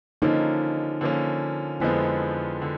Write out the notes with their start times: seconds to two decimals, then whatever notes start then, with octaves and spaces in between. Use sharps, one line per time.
0.22 D3 F3 A#3 C#4 D#4
1.01 D3 F3 A#3 C#4
1.80 F2 D3 F3 G#3 B3 E4
2.62 D3